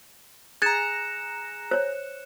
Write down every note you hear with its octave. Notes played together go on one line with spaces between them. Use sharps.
G#4 A#5 F#6 G#6 A6 C#7 E7
C5 C#5